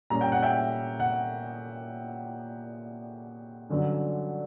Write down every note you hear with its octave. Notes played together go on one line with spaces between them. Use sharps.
A#2 G3 C#4 A#5
G5
F#5
E5 G5
F#5
G2 D3 F#3 C#4